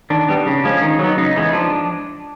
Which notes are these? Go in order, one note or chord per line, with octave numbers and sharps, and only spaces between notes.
D#3 D4
G3 B3
C#3
F3 G#3 C#4
D#3 D#4
F#3 B3 D#4
C#3 D#4
E3 G#3 B3
F3 D4